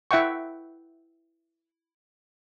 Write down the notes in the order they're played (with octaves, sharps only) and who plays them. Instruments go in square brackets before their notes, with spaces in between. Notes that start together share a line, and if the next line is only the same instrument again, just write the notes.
[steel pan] E4 E5 F#5 G5 C#6